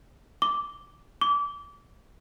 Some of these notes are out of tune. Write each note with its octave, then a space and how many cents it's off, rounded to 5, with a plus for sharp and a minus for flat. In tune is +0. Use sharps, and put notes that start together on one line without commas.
D6 -10
D6 -30